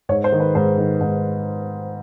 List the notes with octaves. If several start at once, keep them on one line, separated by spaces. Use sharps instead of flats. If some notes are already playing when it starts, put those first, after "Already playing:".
G#2 C#5
C5
D#3
B4
G#2 C5
D#3
G#2